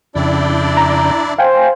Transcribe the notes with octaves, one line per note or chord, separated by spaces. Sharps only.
F2 C#3 D4 E4 D5 G5
A#5
C5 F5 G5 G#5